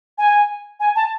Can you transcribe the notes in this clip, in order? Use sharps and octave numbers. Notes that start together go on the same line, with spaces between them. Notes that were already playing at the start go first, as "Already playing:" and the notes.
G#5
G#5
A5